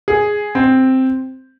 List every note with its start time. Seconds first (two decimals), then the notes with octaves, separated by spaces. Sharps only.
0.08 G#4
0.55 C4